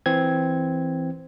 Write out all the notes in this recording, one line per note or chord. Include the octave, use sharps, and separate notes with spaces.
E3 C4 G#6